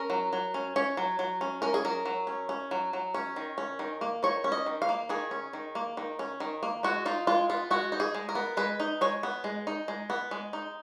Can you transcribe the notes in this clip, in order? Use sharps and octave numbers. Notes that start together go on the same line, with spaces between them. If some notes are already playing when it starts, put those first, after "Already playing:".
Already playing: C#4 A#4
F#3
F#3
C#4
C#4 C#5
F#3
F#3
C#4
C#4 A#4
G#4
F#3 A#4
F#3
C#4
C#4
F#3
F#3
C#4
D#3
C#4
D#3
A#3
D#3 C#5
C#4
D#5
D#3
F5
A#3
D#3 G#4
C#4
D#3
A#3
D#3
C#4
D#3
A#3
G#3 F#4
D#4 F4
G#3 F4
B3 F4
G#3 F#4
D#4
G#4
G#3
A#4
B3
G#3 B4
D#4
G#3 C#5
B3
G#3
D#4
G#3
B3
G#3
D#4